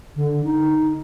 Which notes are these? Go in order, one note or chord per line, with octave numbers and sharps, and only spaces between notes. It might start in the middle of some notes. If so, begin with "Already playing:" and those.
D3
D#4